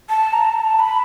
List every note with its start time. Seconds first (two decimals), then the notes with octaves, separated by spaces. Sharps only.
0.09 A5
0.33 A#5
0.44 A5
0.80 B5